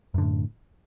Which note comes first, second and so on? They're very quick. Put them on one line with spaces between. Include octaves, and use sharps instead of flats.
F#2 D3 A2